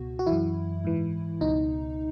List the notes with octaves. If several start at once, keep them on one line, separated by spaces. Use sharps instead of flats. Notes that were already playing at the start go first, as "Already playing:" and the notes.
Already playing: C#2 B2 F#4
F#4
F#2 E3 E4
G#2 E3
C#2 B2 D#4